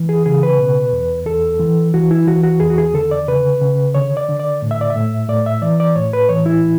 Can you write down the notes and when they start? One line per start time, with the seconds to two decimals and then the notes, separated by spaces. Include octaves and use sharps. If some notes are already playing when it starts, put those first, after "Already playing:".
Already playing: E3
0.09 G#4
0.26 C#3 G#4
0.43 B4
0.59 B2
0.93 E2
1.26 E2 A4
1.60 E3
1.94 E3 F#4
2.11 E4
2.27 E3 F#4
2.43 F#4
2.60 E2 G#4
2.70 F#4
2.78 G#4
2.94 D3 A4
3.11 D5
3.28 C#3 B4
3.61 C#3
3.95 D3 C#5
4.17 D5
4.29 D3
4.40 D5
4.62 A2
4.71 E5
4.81 D5
4.90 E5
4.95 A2
5.29 A2 D5
5.46 E5
5.62 E3 D5
5.80 D5
5.96 A2 C#5
6.13 B4
6.29 E3 C#5
6.46 E4